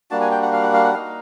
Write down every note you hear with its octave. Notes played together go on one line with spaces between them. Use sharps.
G3 A#3 D4 F#4 A5
G#5
G5
F#5
F5
F#5
F5
F#5
A#3 D#4 F#4 F5